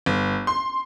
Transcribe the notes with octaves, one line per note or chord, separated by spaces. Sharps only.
G1
C6